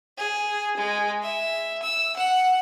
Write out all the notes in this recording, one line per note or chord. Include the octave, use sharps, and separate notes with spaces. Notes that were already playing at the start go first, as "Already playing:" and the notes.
G#4
G#3
E5
E6
F#5